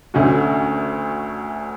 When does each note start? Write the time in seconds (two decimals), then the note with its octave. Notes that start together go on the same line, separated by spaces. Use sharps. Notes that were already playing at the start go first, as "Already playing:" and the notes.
0.14 D2 D3 A3 C#4 F#4